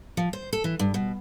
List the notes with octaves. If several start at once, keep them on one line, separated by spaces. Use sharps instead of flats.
F3
C5
A4
E3
G2
B2